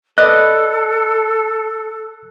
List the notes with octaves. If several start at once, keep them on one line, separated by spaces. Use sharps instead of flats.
A4 B4 D5 D#5 F#6